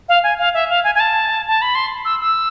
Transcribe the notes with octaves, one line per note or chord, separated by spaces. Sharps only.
F5
G#5
F5
E5
F5
G#5
G#5
A5
A5
B5
C6
E6
E6